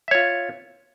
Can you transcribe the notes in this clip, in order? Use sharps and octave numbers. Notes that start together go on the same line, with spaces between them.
F4 C#5 E5